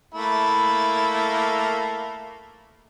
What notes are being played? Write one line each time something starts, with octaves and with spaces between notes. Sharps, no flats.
A3 A#3 E4